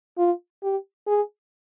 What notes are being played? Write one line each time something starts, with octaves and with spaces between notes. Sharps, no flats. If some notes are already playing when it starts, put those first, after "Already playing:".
F4
G4
G#4